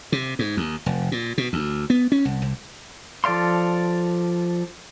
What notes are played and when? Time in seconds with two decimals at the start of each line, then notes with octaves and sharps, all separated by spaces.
0.12 C3
0.39 G#2
0.57 D#2
0.86 F1
1.12 A#2
1.38 B2
1.53 D2
1.90 B3
2.12 C#4
2.25 C2
2.42 C2
3.24 F3 A4 D5 F5 C6